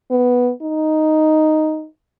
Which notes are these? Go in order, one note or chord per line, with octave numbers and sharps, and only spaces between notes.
B3
D#4